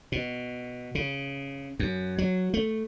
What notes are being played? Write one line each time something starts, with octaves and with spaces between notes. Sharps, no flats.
B2
C#3
F#2
F#3
A3